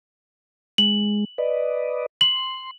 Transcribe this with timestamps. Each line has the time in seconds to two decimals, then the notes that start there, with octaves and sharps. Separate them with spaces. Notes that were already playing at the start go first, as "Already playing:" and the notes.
0.78 G#3 F#7
1.38 B4 D5 D#5
2.21 C6 F#7